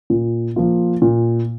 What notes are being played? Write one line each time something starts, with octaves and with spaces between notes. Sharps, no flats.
A#2
F3 A#3 F4
A#2